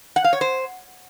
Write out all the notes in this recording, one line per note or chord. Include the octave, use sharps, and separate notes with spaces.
F#5
F5
C#5
C5